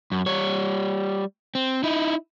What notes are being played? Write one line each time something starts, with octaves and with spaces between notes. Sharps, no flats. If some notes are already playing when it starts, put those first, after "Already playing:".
F#2
G3 C#5
C4
D#4 E4